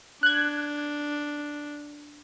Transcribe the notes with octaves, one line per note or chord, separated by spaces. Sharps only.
D4 F#6 G#6